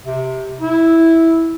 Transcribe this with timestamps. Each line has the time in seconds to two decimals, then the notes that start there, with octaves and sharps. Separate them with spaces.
0.06 C3
0.61 E4